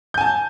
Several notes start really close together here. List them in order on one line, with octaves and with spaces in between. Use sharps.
G6 G#5 A5